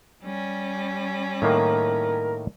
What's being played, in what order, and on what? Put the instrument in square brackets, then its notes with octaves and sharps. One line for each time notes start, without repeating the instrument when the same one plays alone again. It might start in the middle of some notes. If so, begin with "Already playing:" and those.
[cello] G3 C#4
[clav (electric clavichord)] A2 D#3 A#3 [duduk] A#4